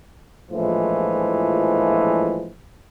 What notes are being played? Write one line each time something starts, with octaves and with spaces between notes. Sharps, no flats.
A#1 A2 E3 F3 G#3